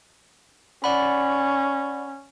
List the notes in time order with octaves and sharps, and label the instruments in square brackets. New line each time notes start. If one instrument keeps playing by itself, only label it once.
[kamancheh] C#4 [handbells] D5 F#5 B5